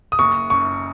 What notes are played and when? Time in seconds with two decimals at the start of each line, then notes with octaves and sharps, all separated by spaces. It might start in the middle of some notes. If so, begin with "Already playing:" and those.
0.12 D#6
0.19 F#1 C#6
0.50 F#2 C#6